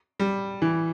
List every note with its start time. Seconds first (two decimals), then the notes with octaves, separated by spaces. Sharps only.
0.20 G3
0.62 E3